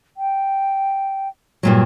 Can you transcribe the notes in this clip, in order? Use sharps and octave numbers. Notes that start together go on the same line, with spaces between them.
G5
G2 A#2 F#3